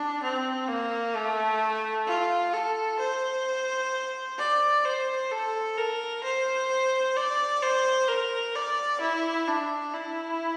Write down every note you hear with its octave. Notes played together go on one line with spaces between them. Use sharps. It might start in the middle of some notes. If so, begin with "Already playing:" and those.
Already playing: D4
C4
A#3
A3
F4
A4
C5
D5
C5
A4
A#4
C5
D5
C5
A#4
D5
E4
D4
E4